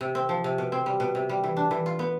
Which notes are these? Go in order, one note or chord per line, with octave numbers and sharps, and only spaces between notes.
C3
C4
F3
C3
B2
C4
G3
B2
C3
G3
E3
D4
E3
F4
B3